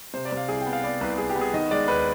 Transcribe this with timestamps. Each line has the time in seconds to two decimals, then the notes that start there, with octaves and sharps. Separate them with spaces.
0.14 C3 C5
0.25 D5
0.32 C3 F5
0.49 C2 G#4
0.61 G5
0.66 B3
0.73 F5
0.83 B3 D5
1.01 C2 B4
1.18 C2 G#4
1.30 G4
1.36 B3
1.41 G#4
1.54 D#3 D#5
1.71 G#3 D5
1.88 D#2 B4